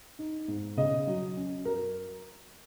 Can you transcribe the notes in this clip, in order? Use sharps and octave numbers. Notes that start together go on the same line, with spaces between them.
D#4
G#2
C#3 D#5
F#3
C#4
F#2 A#4